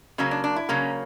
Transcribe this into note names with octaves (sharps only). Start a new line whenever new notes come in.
C#3 F#3 A#3 C#4
D4
D4
E4
C#3 F#3 A#3 C#4